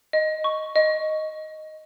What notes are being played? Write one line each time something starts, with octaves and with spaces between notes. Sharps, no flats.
D#5
C#6
D#5